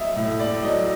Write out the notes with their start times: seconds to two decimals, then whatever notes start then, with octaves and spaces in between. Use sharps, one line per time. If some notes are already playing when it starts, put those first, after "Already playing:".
Already playing: F#3 D#5 E5
0.16 A2
0.40 D5
0.63 F#3 D#5